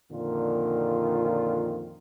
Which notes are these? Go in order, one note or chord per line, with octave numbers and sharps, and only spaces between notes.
F2 A#2 D3 D#3 F4